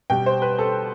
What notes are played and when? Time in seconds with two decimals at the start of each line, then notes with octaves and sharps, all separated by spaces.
0.10 B2 G3 G5
0.26 C5
0.42 B4
0.59 A4